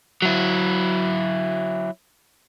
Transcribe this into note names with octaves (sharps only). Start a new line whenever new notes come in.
F#3 E4